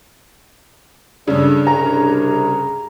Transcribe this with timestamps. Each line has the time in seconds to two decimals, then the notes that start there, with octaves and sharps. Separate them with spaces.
1.28 G2 C#3 D4 G#4 A4
1.67 C2 C3 G#4 A#5